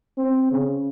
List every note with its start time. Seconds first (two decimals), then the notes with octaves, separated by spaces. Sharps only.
0.18 C4
0.51 C#3